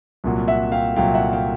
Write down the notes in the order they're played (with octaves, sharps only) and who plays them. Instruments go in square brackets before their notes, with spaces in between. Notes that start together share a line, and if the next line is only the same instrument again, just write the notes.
[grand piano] C2 A#2 F#3
E5 F#5
F5 G5
C2 A#2 F#3 F5 G5
E5 F#5
F5 G5